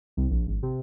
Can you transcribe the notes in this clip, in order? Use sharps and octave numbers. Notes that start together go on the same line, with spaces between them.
C2
A#1
G#1
C3